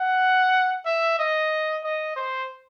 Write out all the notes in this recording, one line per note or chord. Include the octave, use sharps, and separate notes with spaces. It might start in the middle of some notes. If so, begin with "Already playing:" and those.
Already playing: F#5
E5
D#5
D#5
C5